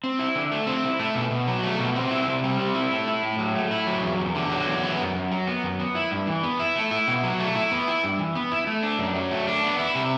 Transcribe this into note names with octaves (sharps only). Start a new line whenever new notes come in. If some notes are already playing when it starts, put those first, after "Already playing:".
C4
E4
D3
A3
C4
E4
A3
B2
B2
F#3
A3
B2
C4
E4
C3
G3
C4
E4
A3
E4
A2
F#3
A3
E4
F#3
E2
E2
D3
F#3
E2
B3
F#2
F#2
F#3
B3
F#2
B3
E4
G2
E3
B3
E4
A3
E4
B2
F#3
A3
E4
B3
E4
G2
E3
B3
E4
A3
D4
F#2
F#3
A3
D4
B3
E4
C3